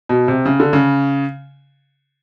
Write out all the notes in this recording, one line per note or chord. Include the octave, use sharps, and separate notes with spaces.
B2
C3
C#3
D3
C#3